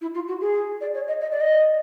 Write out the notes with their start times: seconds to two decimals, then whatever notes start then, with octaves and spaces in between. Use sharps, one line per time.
0.01 E4
0.14 F4
0.27 F#4
0.41 G#4
0.81 D5
0.94 C#5
1.07 D#5
1.21 D#5
1.31 D5
1.40 D#5